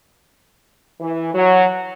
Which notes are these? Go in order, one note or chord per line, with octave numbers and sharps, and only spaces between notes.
E3
F#3